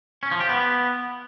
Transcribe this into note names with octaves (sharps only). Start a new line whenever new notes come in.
C#4
F3
G4
B3